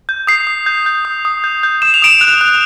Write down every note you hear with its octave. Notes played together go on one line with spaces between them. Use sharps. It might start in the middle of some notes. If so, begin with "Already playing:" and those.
G6
D#6 C7
D#6
G6
G6
D#6
D#6
G6
G6
D#6 E7
F7
D#6 D7 E7
F#6
F#6